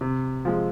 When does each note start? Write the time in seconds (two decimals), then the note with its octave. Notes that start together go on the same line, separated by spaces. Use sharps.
0.01 C3
0.45 F3 G#3